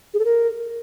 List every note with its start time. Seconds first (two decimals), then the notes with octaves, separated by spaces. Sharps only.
0.14 G#4
0.19 A4
0.25 A#4